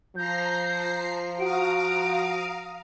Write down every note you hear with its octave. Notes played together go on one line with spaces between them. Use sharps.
F3 A#5 G6 A#6 C7
F#4 F5 A#5 D#6 D7